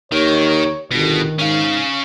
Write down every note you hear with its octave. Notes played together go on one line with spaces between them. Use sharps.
D#2 D#3 C#5
G1 B2 D#3
G#2 C#4 F5